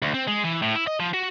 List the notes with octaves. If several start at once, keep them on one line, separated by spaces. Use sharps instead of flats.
D2
C4
G#3
E3
A2
E4
D#5
F3
F#4